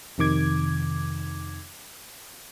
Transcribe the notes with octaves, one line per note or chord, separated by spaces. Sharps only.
F2 C3 D#3 D6 G#6